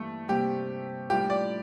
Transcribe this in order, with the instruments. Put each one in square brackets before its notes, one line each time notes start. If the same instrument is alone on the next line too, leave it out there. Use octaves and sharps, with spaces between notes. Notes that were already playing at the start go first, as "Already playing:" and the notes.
Already playing: [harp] G2 E3 G3 A#3 [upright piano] A3
[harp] C3 G3 A#3 [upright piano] G4
[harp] A2 G3 D4 F4 [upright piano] G4
[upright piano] D5